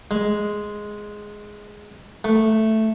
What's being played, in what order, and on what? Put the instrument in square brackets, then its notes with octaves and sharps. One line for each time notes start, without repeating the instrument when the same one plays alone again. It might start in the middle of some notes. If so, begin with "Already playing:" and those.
[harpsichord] G#3
A3